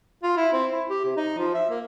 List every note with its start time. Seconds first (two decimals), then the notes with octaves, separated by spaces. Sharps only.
0.23 F4
0.37 E4
0.53 C4
0.72 E4
0.89 G4
1.05 C3
1.17 D#4
1.38 F3
1.54 E5
1.70 A#3